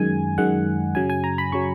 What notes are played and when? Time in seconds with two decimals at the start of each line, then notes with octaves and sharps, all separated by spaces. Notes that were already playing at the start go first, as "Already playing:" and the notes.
Already playing: F#2 D#3 G#3 G#5
0.38 F#2 D#3 G#3 F#5
0.95 F#2 C#3 F#3 G#5
1.10 G#5
1.24 A#5
1.38 B5
1.52 C#3 F#3 C#6